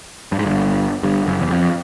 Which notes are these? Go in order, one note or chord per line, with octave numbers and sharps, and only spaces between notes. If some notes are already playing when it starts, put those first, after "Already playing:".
G2
G#2
G1 G2
G1 G2
F#1 F#2
E2
F2